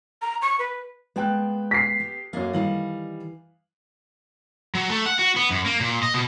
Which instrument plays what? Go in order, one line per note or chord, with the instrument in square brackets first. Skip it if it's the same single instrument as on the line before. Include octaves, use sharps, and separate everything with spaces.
[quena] A#5
C#6
B4
[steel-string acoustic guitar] G#3 A#3 A5 [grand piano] B3 G5 F#6
[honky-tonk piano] B6 C7
[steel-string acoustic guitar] G4
[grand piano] F#2 A#3 [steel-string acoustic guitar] G#4 D5 D#5
[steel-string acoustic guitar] D#3 G3 D#5 [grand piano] E3 F5 F#7
[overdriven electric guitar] F#3
A3
F#5
F#4
B3
F#2
A#3
A#2
D#5
B2